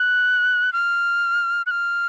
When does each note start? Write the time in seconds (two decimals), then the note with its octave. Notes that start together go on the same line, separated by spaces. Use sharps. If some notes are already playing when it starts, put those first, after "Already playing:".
Already playing: F#6
0.73 F6
1.66 F#6
1.71 F6